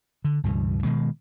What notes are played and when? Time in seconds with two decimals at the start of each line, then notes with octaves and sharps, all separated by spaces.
0.25 D3
0.44 C#2 G2 B2 E3
0.84 B2 D#3 G#3